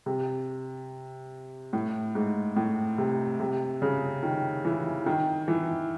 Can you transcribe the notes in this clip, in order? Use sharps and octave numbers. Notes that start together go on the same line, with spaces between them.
C3
A2
G#2
A2
C3
C3
C#3
D#3
E3
D#3
E3